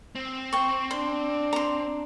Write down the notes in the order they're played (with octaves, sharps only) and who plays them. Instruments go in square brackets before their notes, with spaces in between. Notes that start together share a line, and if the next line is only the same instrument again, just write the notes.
[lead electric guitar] C4
[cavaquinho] G5 C#6
[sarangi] D4 [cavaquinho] C6
[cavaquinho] A#5 C6